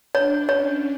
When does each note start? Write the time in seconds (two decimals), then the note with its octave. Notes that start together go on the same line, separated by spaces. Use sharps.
0.14 D4 C#5
0.49 C#4 C#5